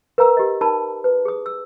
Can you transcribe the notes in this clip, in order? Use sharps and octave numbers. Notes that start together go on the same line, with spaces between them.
A#4 B4 F5 A#5 E6
G4 D#5
D#4 A#4 A5 B5
B4
G#4 D#6
E6